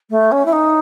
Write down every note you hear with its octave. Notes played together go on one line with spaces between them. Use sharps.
A3
C#4
E4
D#4